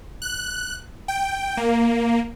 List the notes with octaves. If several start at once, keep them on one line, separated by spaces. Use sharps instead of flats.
F#6
G5
A#3